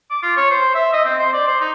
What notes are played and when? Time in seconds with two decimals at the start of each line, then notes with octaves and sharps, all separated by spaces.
0.11 D6
0.23 F4
0.37 C#5
0.51 C5
0.75 E5
0.93 D#5
1.05 C4
1.19 C5
1.33 D5
1.48 C5
1.60 D#4